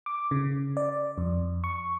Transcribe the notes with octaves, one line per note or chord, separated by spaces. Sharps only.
D6
C#3
D5
F2
C#6